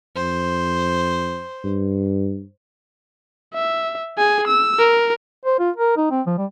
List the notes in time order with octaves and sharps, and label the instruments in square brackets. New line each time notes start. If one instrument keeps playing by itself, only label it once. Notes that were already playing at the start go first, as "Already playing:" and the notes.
[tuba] F2 [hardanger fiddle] C5
[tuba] G2
[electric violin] E5
G#4 G#5
E6
A#4
[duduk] C5
F4
A#4
D#4
C4
F3
G3